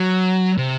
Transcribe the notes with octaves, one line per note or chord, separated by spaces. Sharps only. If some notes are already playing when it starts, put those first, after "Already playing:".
Already playing: F#3
C3